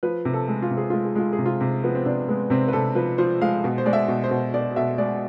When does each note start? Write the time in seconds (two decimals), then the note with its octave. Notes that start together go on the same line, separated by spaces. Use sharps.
0.03 F3 B4
0.25 C3
0.34 A4
0.48 G#3
0.62 F4
0.71 C3
0.77 G#4
0.90 G#3 F4
1.05 G#4
1.15 G#3 F4
1.33 G#4
1.39 C3
1.46 F4
1.61 C3
1.84 F3 B3
1.95 C4
2.05 C3 D4
2.29 G#3 B3
2.50 C3 C4
2.68 B4
2.73 C3 A4
2.95 F3 B4
3.18 F3 C5
3.42 G#3 F5
3.64 B2
3.78 C5
3.86 G#3 D5
3.93 E5
4.08 B2
4.24 C5
4.31 B2
4.54 B2 D5
4.76 B2 E5
4.98 G#3 D5